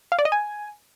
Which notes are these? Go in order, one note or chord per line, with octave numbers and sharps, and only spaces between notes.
F5
D5
D#5
G#5